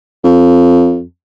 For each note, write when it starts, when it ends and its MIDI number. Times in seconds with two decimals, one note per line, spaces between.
0.24 1.02 41